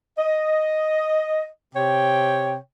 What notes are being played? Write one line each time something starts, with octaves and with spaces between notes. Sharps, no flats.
D#5
C3 C#5 G5